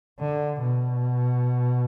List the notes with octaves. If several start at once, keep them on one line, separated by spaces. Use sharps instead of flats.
D3
B2